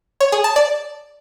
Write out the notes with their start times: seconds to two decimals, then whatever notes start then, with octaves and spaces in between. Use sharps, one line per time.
0.20 C#5
0.32 G#4
0.44 A5
0.56 D5